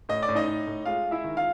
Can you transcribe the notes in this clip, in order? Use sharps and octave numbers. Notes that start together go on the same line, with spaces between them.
A2 D#5
D5
A2
D#4 D#5
A2
A2
G#3 F4 F5
G#3
E4 E5
D#3
F4 F5